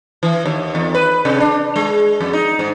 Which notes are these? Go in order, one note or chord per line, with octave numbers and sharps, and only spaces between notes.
E3
D#2
E2
B4
C3
D4
G#3
F2
D#4
G#2